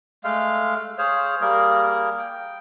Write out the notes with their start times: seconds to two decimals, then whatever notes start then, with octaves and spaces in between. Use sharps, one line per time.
0.24 G#3 A3 F5
0.98 G#4 C5 C#5 F5
1.41 G3 A#3 G#4 A#4
2.19 G5